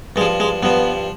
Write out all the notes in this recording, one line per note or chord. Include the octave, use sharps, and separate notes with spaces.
G2 G#3
F3
G#3
G2 F3 B3